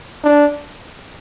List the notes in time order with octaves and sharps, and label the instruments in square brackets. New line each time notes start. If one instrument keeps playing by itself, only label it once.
[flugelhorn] D4